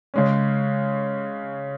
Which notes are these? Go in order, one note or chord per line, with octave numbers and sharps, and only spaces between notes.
C#3 G#3 C#4